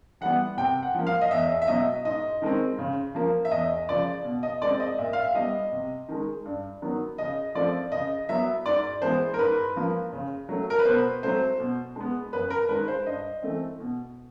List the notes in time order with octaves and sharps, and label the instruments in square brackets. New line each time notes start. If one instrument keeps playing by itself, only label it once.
[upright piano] E3 G3 B3 F#5
C3 G5
F#5
F3 A#3
F5
D#5
E2 E5
E5
B2 F#3 D#5
G#2 D#5
D#3 G#3 C4
C#3
F3 A#3
E5
E2 D#5
C#3 F3 D5
B2
D#5
G#3 C4 D5
D#5
A#2 E5
F5
E5
G3 B3 D#5
C3
D#3 G#3
G2
D#3 F#3 B3
C#3 D#5
F3 A3 C4 D5
C#3 D#5
F#3 B3 E5
G#2 D5
E3 G#3 B3 C5
A#4
G#2 B4
F3 A#3
C#3
F#3 A3
A#4
B4
B2 C5
F#3 A3 C4 C5
B2
G#3 B3
F#2 B4
A#4
D#3 G#3 B4
C5
G2 D#5
E3 A3 C4
B2